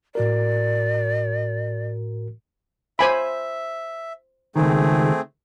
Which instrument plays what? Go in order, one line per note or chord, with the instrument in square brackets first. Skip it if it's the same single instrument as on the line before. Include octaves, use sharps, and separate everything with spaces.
[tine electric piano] A2 F#4 A#4 [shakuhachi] D5
[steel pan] C5 G#5 B5 [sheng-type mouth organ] E5
[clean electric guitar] C#2 D#3 [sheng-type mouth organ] A3 C4 G#4